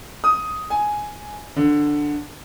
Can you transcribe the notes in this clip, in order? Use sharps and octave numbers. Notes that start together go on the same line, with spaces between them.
D#6
G#5
D3